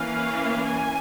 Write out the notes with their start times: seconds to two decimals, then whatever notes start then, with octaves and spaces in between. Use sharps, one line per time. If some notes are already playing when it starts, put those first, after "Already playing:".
Already playing: E3 A#3 C#4 F5
0.66 G#5